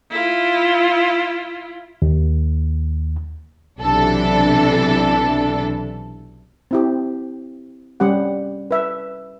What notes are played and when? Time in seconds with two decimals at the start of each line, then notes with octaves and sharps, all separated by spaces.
0.11 E4 F4
2.02 D#2
3.80 B1 C3 E3 D4 A4
6.71 C4 E4 G4
8.00 G3 C#4 G4 F#5
8.71 B4 E5